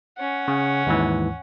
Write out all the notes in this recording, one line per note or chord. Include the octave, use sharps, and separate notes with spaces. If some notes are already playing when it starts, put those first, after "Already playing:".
C#4 F#5
C#3
D#2 G#2 E3